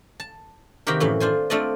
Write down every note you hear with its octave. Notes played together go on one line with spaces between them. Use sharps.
A5
C3 D#3 A#3 F#4 G4 A#4
F#2 A2 E3
D4 F4 C5 G#5
A3 C4 D4 F4 D5 D#5